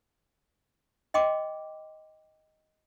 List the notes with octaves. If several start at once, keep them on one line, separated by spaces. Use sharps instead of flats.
D#5 G5 C6 D6